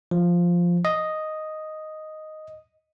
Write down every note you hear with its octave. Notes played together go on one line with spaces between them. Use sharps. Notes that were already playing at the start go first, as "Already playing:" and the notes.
F3
D#5